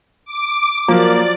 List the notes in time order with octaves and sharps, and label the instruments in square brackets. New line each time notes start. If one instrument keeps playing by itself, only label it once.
[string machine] D6
[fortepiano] F3 F#3 [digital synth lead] A#3 [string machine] D5